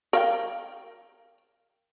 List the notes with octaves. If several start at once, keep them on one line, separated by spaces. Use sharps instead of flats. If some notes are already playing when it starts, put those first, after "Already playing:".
A#4 F5 G5